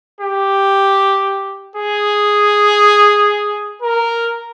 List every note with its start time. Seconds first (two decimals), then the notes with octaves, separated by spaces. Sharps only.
0.20 G4
1.76 G#4
3.82 A#4